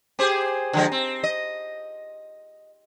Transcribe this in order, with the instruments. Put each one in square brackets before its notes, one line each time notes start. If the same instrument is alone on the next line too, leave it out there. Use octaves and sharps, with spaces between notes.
[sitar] G4 G#4 C5
D3 F3 G#3
C4
D#5